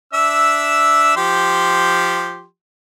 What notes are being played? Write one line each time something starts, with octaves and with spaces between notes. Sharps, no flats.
D4 E5 E6
F3 G4 C6